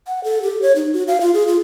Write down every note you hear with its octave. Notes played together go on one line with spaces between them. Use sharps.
F#5
A4
G4
C#5
D#4
F#4
F5
F4
G#4
F4